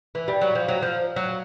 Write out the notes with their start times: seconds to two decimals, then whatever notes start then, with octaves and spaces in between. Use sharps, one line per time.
0.15 E3
0.28 G3
0.41 F#3
0.55 F3
0.68 F#3
0.82 F3
1.16 F#3